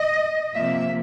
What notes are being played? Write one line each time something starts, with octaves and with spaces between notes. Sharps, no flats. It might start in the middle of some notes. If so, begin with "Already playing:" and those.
Already playing: D#5
C3 F3 A#3 E5